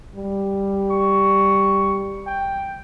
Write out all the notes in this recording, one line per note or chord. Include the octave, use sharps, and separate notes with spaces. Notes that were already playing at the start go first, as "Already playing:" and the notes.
G3
C#6
G5